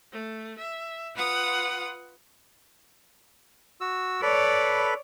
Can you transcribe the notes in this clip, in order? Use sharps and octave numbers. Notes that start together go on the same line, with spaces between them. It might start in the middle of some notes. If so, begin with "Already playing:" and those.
A3
E5
F4 B4 F#5 D#6
F#4 E6
A4 B4 C#5 D5 B5